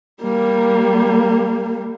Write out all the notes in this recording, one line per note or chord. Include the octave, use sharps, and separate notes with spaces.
G3 A#3